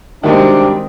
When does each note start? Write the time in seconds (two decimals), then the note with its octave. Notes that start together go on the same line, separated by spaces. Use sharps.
0.23 C3 D#3 G3 G#3 C4 D4 F#4 A#4